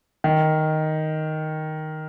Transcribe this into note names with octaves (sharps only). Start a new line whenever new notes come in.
D#3